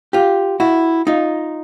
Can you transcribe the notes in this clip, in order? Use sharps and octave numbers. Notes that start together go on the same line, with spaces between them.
F4 G4
E4 F#4
D#4 F4